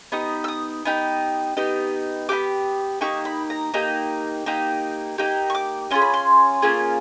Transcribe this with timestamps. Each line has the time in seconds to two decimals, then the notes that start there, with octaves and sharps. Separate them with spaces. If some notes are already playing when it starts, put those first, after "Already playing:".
0.12 B3 D#4 G4 D#6
0.44 E6
0.48 D#6
0.85 B3 D#4 G4
1.57 B3 D#4 G4
2.29 B3 D#4 G4 D6
3.01 A#3 D#4 G4 C#6
3.25 B5
3.50 A#5
3.74 A#3 D#4 G4
4.46 A#3 D#4 G4
5.18 A#3 D#4 G4
5.50 C#6
5.55 D6
5.91 A#3 C#4 F4 G#4 C6
6.02 B5
6.14 C6
6.62 A#3 C#4 F4 G#4